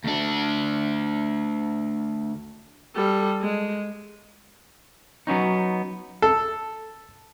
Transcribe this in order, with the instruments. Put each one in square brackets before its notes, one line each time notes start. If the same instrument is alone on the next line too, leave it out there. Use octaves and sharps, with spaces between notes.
[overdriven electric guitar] D2 D4
[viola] G3 A4
G#3
[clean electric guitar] F#3 B3 C#4 D#4
[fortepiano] A4